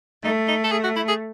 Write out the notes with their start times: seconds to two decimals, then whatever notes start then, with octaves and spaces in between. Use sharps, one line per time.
0.23 A3 D#4
0.48 D#4
0.64 A4
0.72 G#4
0.84 F#4
0.96 E4
1.08 G#4